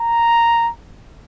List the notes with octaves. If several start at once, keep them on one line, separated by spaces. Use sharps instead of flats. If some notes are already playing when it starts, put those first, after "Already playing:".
Already playing: A#5